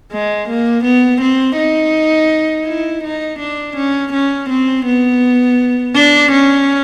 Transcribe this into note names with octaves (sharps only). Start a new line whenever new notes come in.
G#3
A#3
B3
C4
D#4
E4
D#4
D4
C#4
C#4
C4
B3
D4
C#4